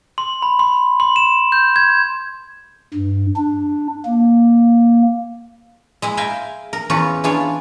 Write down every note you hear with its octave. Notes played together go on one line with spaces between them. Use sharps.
C6
B5
C6
C6
E7
G6
G#6
G2
D4
A#3
G#3 E4 G#4
E5 F5 G5 G#5 A#5
A#4
E2 C#4 F4 B4 C#5 A#5
E3 D4 F4 G#4 C#5